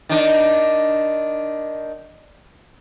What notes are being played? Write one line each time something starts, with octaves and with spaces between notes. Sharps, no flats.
D#3 D4